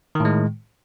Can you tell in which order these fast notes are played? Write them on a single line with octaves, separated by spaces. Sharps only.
D#3 A2 G#3